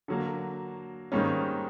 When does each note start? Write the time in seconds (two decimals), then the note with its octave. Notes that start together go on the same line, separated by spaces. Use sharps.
0.08 D3 F#3 A#3
1.12 G#2 D#3 G3 A#3 C#4